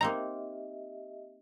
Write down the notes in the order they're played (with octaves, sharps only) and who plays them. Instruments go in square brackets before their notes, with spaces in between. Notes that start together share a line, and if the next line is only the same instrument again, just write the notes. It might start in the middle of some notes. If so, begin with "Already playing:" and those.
[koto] A#3 C4 D#4 [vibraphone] G4 D#5 E5 [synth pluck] A#5